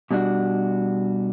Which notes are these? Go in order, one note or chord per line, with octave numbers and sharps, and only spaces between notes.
B2 G3 D4 F#4